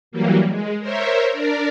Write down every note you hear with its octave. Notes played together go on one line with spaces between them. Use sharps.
E3 F#3 G3 A#3
G#3
A#4 C5 C#5 E5
D4 A#4 D5